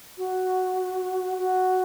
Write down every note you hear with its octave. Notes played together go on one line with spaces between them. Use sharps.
F#4
F#4